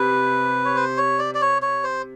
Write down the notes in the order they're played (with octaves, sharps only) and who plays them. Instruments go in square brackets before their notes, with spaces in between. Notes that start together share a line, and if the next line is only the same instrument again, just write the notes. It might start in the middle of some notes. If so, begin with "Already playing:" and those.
Already playing: [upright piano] C3 [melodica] B4
[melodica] C#5
C5
C#5
D5
D5
C#5
C#5
C5